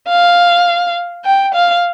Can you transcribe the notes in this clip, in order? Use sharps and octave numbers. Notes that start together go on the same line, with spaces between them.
F5
G5
F5